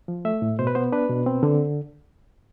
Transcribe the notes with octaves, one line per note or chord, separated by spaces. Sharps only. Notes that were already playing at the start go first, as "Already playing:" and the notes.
F3
A3 E5
A2
B2 C5
B4
B3 C5
D4 B4
B2
C4
D3